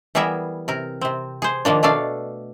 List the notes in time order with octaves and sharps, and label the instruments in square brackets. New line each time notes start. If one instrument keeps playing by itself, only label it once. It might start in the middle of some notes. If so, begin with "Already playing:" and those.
[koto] E3 G3 B3 G#4 A#4 E5
C3 A#4
C3 C4
G#4 C5
D#3 F3 A#3 D4
B2 A3 D4 A4 D5 F5